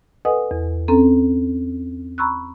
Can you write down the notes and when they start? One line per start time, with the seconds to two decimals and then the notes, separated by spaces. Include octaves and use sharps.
0.25 A4 B4 D#5 F#5 G#5 D#6
0.51 E2
0.88 C4 C#4 A4 A#5
2.18 A#5 B5 C#6 E6 F#6